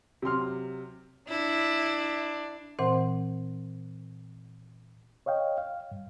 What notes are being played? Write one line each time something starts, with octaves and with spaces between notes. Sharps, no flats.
C3 F#3 C6 F6
D4 E4
A#2 E3 C4 C5 F#5 C6
C#5 D#5 F5 G5
F5
G2